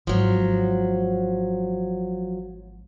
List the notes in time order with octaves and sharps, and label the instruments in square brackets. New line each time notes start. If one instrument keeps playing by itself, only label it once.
[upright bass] G#1 [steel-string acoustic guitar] F3 F#3